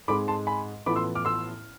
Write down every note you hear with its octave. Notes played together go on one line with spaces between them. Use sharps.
G#2 G#3 C4 B5 D6
A5 C6
G#5 B5
A1 A2 F3 B3 B5 D6
C6 E6
D6 F6
C6 E6